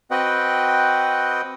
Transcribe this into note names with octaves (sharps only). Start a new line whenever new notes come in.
C4 F#4 B4 D#5 F#5 G5